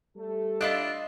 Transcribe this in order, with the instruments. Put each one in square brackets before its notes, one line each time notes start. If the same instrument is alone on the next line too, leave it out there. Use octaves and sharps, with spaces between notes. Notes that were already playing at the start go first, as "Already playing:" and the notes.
[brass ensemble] G3 A3 A4
[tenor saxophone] D4 [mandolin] E4 F4 F#6 [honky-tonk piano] D#5